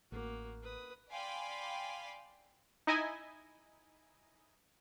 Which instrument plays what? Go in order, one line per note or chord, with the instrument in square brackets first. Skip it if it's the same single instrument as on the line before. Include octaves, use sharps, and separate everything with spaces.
[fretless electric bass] A1 [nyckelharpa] A#3 F#4
[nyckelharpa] B4 D#6
[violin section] D5 F5 G5 G#5 B5 C6
[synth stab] D#4 E4 D#5 G#5